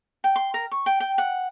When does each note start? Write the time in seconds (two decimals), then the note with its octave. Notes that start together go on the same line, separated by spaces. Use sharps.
0.24 G5
0.36 C6
0.54 A#4
0.72 C#6
0.86 G5
1.00 G5
1.18 F#5